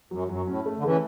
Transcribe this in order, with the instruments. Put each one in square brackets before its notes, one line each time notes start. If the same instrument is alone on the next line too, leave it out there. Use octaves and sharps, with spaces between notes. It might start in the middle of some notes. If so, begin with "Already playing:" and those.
[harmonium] F#2 [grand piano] F#3
[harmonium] F#2 [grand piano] F#3
[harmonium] A2 [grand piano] C#4
[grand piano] A3
[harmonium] D3
[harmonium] C#3 E3 [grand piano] A3